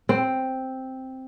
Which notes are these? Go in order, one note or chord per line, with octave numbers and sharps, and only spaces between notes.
C4